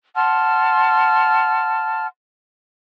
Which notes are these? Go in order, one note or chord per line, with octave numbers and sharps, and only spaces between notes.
F#5 A5 C6 F6